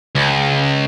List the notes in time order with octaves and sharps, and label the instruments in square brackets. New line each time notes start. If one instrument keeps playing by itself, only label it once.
[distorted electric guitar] C#2